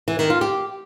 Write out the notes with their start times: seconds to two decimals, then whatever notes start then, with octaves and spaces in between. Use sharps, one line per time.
0.08 E3
0.19 D#3
0.30 F4
0.41 G4